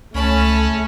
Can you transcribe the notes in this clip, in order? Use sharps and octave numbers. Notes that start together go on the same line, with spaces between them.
C#2 A3 C#4 A5 B5